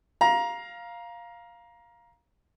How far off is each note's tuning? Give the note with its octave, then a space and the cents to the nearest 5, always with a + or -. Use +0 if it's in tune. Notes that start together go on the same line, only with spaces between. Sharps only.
F5 +0 A#5 +20